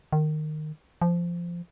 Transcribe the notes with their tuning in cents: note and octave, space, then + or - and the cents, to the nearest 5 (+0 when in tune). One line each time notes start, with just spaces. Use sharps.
D#3 -20
F3 -15